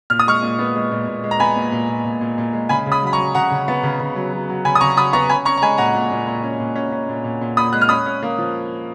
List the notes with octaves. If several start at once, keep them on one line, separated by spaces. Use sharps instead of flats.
A#2 F6
D#6
G#3 C#6 F6
A#2
B3
G#3
A#2
A#2
G#3
A#5
B3 G#5 B5
A#2
A#2
A#2
A#2
A#2
A#2
G#3
C#3 G#5 B5
C#3
B5 D#6
F#3 B5
A#5 C#6
F#3
C#3 F#5 A#5
C#3
B3
C#3
C#3
F#3
F#3
F#3
C#3 G#5 B5
D#6
C#3 A#5 C#6
F#3 B5 D#6
B3 A#5 C#6
C#4 G#5 B5
C#4 A#5 C#6
A#5
G#3 G#5 B5
A#2 F#5 A#5
A#2
A#2
A#2
C#4
A#2
C#4
C#4
A#2
A#2
A#2
A#2 B5 D#6
G#3 F#6
F6
C#4 B5 D#6
C#4
A#3
F3